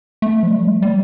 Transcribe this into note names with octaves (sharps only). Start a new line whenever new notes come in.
A3
F3
G3
A3
G3